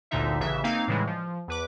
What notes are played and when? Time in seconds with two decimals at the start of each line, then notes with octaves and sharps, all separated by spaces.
0.11 G1 D2 A#2 D3 D#4 E5
0.40 A1 C#3 E3 E5
0.64 A#3 C4 D#4 F5
0.88 A2 C#3 E3 G3 G#3
1.07 F3
1.48 E2 B4 D6